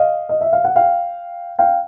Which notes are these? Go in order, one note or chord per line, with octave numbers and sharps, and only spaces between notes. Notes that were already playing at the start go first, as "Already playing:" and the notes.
Already playing: D#5 F5
D#5
E5
F5
F#5
F5 G5
F5 G5